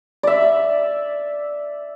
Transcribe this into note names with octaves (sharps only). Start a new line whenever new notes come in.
D5 E5